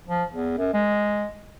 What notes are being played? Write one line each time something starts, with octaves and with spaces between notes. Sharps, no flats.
F3
E2
F#2
G#3